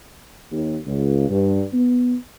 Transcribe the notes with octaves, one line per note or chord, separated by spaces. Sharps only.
D#2
C#2
G2
B3